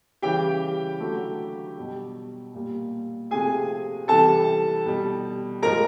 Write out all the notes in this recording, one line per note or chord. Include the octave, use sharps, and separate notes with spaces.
C#3 E3 G3 G4 G5
D3 F#3 A3
B2 G3
A#2 G3
C3 F3 A3 G#4 G#5
C3 E3 G3 A4 A5
B2 G3
A2 F3 G#3 A#4 A#5